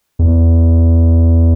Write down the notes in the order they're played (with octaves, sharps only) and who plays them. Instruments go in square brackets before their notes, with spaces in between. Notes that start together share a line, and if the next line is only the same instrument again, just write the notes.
[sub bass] E2